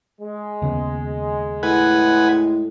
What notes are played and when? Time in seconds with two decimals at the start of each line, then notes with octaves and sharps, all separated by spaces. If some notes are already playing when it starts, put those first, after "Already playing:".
0.21 G#3
0.62 D#2 C#3 B3
1.63 A2 B4 F#5 G#5